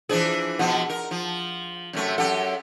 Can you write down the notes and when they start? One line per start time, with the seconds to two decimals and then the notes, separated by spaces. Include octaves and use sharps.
0.09 E3 F3 D4 G#4
0.59 B2 F3 F#5
0.90 A#4
1.11 F3
1.93 F#2 C3 A3
2.18 F#2 G4 A4 F#5